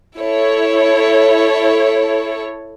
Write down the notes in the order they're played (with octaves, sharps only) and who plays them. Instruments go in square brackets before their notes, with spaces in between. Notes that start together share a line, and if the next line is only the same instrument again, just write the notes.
[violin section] E4 A4 C#5